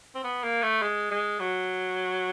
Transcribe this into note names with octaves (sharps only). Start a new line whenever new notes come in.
C4
B3
A#3
A3
G#3
G#3
F#3